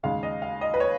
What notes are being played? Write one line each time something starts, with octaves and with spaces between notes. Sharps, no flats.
D#2 C#3 G#3 D#4 F5
D#5
F5
D#5
B4
C#5